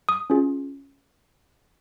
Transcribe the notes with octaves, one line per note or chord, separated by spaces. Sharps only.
D#6
C#4 F4 G#4